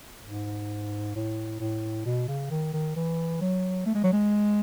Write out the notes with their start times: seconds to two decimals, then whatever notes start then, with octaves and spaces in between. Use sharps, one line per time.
0.25 G#2
1.15 A2
1.60 A2
2.06 B2
2.28 C#3
2.51 D#3
2.74 D#3
2.96 E3
3.41 F#3
3.86 A3
3.95 G#3
4.04 F#3
4.12 G#3